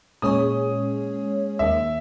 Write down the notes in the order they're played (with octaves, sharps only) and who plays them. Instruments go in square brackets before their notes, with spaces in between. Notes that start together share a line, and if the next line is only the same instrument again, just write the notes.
[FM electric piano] A#2 G#3 C#4 G#4 C#5 [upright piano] D#6
[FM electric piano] D#2 D#3 A#3 [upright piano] E5